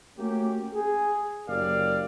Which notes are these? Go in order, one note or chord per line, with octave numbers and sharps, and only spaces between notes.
A3 A#3 C#4 F#4 G4
G#4
F#1 C#4 G4 A#4 D5 F5